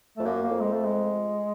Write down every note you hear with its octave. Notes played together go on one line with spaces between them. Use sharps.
F2 A3
F#2 A#3
A#3
F2
G#3
A3
G#3